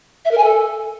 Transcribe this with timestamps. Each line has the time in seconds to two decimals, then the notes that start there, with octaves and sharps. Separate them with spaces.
0.25 E5
0.31 A#4
0.37 G#5
0.44 A4